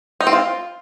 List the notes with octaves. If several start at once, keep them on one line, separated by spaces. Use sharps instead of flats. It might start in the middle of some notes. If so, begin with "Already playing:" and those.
D#4
C4
F4